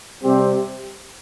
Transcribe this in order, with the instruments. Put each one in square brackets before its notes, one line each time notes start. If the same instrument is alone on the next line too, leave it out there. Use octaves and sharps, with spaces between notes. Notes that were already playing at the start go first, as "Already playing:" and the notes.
[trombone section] C3 G3 C4 G4